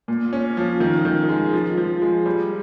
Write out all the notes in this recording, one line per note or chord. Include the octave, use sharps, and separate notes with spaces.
A#2
C#4
F3
D#3
D#3
G#3
F3
F3
G#3
G3